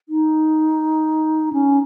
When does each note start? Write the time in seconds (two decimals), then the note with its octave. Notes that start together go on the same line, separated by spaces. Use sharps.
0.09 D#4
1.53 C#4